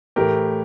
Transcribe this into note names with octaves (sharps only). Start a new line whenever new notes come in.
A2 E3 A3 G4 A#4